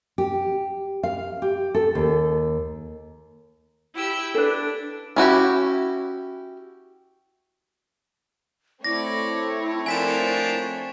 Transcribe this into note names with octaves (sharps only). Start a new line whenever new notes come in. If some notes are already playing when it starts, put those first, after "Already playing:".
G4
F5
G4
A4
D#2
E4 G4 E6
D4 A4 B4
C#4 E4 F#4 G4
A3 C4 E4 C#5 D5 A#6
F3 A#3 D4 G#5 B6 E7